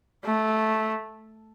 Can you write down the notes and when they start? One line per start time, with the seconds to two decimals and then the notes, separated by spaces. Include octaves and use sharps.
0.25 A3